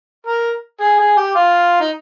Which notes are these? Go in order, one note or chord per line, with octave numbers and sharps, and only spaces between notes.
A#4
G#4
G#4
G4
F4
D#4